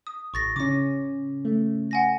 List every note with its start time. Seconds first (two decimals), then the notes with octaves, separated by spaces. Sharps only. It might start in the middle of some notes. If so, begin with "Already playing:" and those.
0.07 D#6
0.34 A1 C#6 A6 A#6
0.56 C#3 C#4 D6 A#6
1.45 A3
1.91 F#5 G#5 A#6